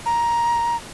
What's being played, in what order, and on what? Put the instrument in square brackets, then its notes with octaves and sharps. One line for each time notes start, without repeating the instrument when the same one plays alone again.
[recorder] A#5